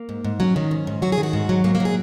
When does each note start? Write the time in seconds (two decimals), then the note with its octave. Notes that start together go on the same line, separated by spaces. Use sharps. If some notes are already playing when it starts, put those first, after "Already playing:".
Already playing: A#3
0.09 G#2
0.25 G#2
0.40 F#3 C#4
0.56 D#3
0.71 G#2
0.87 G#2
1.02 F#3 F#4
1.12 G#4
1.18 D#3
1.23 F#4
1.33 G#2
1.49 F#3
1.64 G#2 A#3
1.75 A#3
1.80 F#3
1.85 G#4